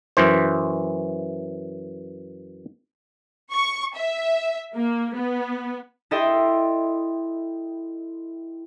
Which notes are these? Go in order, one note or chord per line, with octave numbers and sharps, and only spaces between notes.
F#2 E3 C5
C#6
E5
A#3
B3
E4 A4 D#5 E5 G5 C6